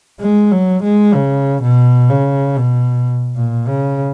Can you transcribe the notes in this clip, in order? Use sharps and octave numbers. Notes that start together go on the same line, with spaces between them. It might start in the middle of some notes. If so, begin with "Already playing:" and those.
G#3
F#3
G#3
C#3
B2
C#3
B2
A#2
C#3